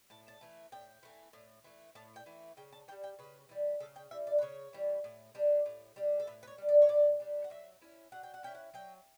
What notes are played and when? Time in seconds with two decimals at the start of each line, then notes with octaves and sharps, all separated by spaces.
0.10 A2 A5
0.28 A5
0.41 E3 A3
0.72 A2 G5
1.03 E3 A3
1.33 A2
1.64 E3 A3
1.95 A2 A5
2.16 G5
2.26 E3 A3
2.57 C#3 G5
2.72 A5
2.88 E3 G5
2.92 G3
3.03 G5
3.19 C#3 B4
3.49 E3 G3
3.80 C#3 A4
3.96 G5
4.11 E3 G3 E5
4.27 D5
4.38 B4
4.42 C#3 C#5
4.73 E3 G3
5.04 A2
5.35 G3 D4
5.66 A2
5.96 G3 D4
6.20 A4
6.27 A2 B4
6.43 B4
6.47 C#5
6.58 G3 D4
6.69 D5
6.82 C#5
6.89 A2 D5
7.20 G3 D4
7.44 F#5
7.50 F#3 E5
7.82 C#4 E4
8.12 F#3 F#5
8.23 G5
8.34 F#5
8.43 C#4 E4 G5
8.55 F#5
8.74 F#3 G5